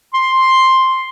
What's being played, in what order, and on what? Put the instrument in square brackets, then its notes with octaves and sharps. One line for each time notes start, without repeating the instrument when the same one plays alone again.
[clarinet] C6